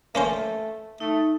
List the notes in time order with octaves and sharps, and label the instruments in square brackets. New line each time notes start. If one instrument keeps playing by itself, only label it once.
[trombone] A3 [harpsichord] A#3 C#4 C5
[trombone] A3 [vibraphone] D#4